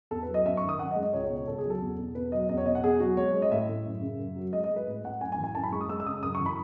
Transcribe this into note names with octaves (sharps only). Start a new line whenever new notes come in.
E2 A4
B4
F#3
D#5
F#2 E5
C#6
D#3
D#6
F#2 F#5
D#5
G#3
D#5
C#2 C#5
C#5
B2
C#5
C#2 A4
G#4
F#3
A4
E2
B2
E2 B4
F#3 D#5
E2 D#5
C#5
B2 D#5
F#5
E2 G#4
F#3 F#4
G#3 C#5
G#3
D#5
A2 E5
A2
F#2
C#3
F#2
F#3
G#3 D#5
D#5
G#3
B4
A2
A2 F#5
F#2 G#5
G#5
E3
G#5
F#2 A5
B5
G#3 C#6
D#6
G#3 E6
E6
C#3 D#6
F#2 D#6
C#6
E3
B5